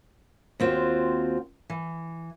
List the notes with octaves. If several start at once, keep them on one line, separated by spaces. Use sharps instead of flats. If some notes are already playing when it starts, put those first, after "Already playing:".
D#2 C4 F4 F#4 C5
E3